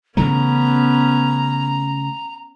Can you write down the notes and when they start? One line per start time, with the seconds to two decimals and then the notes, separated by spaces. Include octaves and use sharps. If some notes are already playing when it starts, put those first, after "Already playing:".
0.17 C#3 E3 A3 B3 C#4 A#5